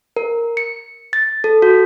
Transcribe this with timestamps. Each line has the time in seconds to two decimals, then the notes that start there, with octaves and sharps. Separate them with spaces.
0.16 A#4
0.57 C#7
1.13 A6
1.44 A4
1.62 F#4